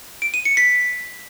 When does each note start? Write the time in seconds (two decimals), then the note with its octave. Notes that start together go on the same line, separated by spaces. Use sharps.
0.22 D7
0.34 D#7
0.45 C#7
0.57 B6